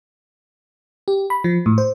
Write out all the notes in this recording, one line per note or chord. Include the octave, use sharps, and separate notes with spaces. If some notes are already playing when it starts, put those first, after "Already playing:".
G4
B5
F3
A2
C5